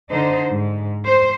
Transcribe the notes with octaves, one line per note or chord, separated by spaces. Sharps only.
D3 D#4 C5
G#2
C5